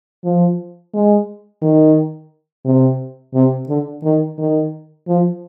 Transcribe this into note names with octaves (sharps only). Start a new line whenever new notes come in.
F3
G#3
D#3
C3
C3
D3
D#3
D#3
F3